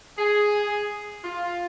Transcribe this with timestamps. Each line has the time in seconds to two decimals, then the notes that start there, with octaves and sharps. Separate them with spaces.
0.18 G#4
1.24 F4